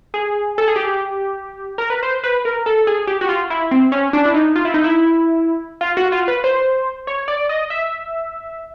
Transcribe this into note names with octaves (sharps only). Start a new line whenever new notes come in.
G#4
A4
G#4
G4
A#4
B4
C5
B4
A#4
A4
G#4
G4
F#4
F4
E4
C4
C#4
D4
E4
D#4
F4
E4
D#4
E4
F4
F#4
F4
B4
C5
C#5
D5
D#5
E5